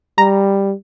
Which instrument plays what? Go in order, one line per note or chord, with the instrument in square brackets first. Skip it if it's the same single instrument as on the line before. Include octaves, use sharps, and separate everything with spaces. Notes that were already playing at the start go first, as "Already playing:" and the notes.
[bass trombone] G3 [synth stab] A#5